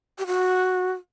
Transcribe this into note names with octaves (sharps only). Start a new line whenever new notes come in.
G4
F#4